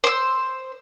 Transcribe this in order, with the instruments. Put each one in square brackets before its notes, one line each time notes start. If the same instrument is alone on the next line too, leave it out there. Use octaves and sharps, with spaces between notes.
[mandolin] C5 E6